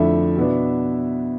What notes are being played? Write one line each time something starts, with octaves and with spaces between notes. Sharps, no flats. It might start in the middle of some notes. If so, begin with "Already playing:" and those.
Already playing: F2 D3 A3 D4 E4 E5
B2 B3 D4